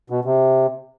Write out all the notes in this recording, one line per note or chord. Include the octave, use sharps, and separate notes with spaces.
B2
C3